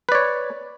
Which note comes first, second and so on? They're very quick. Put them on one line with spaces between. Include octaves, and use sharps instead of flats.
B4 D5 C#5